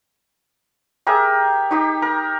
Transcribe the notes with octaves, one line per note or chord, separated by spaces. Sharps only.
G4 G#4 A#4 E5
D#4 G4
A#4